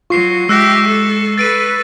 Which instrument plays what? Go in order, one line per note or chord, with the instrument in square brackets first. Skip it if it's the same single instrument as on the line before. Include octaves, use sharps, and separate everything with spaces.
[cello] F#3 [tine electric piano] F4 [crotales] C#6 C7
[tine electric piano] G#3 [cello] G4 E5 [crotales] E6 F#6 A#6
[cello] A4
[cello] A4 B4 [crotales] A6 D7 D#7